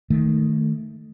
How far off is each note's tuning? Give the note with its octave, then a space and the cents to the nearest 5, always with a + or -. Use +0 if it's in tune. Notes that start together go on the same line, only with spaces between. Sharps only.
D#3 +0 A3 +5